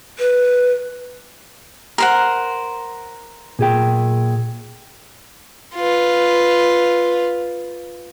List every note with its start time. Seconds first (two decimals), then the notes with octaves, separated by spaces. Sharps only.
0.19 B4
1.98 A#4 C5 F#5
3.59 A#2 G#4 G5
5.75 F4 B4